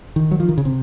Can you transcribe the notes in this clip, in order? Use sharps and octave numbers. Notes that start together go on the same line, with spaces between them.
D#3
F#3
F3
D#3
C#3
C3